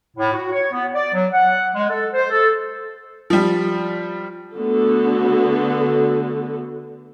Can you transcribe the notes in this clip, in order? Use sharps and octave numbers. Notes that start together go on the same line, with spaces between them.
A2
F#4
C#5
B3
D5
F#3
F#5
G#3
A4
C5
A4
F3 G3
D3 A3 B3 F#4 A4